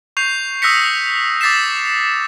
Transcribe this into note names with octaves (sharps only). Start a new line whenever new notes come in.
C#6 G6 C7 F7
D#6 E6 F#6 A#6 B6 C#7
D6 E6 A6 B6 C7 E7